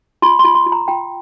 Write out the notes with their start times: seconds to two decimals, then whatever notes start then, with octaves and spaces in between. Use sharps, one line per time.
0.22 F4 C6
0.39 C6
0.44 F4
0.55 C6
0.66 F4
0.72 A#5
0.88 F4 G5